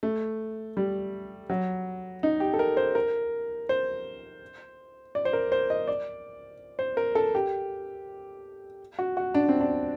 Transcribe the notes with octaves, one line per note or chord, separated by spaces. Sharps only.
A3
G3
F#3
D#4
G4
A4
A#4
C5
A#4
C5
D5
C5
A#4
C5
D#5
D5
C5
A#4
A4
G4
F#4
F#4
D4
C4
D4